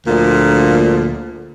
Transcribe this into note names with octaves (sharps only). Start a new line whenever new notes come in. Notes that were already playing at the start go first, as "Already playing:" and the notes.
D2 A#2 D3 F3 A#3